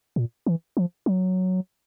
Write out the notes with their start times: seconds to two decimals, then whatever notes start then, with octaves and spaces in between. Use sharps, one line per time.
0.16 A#2
0.46 E3
0.77 F3
1.06 F#3